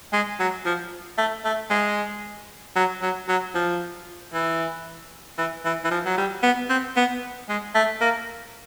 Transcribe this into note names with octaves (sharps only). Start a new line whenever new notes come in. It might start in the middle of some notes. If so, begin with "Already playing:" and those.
G#3
F#3
F3
A3
A3
G#3
F#3
F#3
F#3
F3
E3
E3
E3
E3
F3
F#3
G3
B3
C4
B3
G#3
A3
A#3